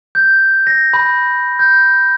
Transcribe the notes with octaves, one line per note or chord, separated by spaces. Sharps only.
G6
A#6
B5
G6